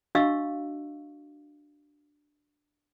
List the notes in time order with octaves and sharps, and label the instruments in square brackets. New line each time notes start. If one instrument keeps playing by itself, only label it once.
[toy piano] D4 F#4 D#5 F5 C#6 E6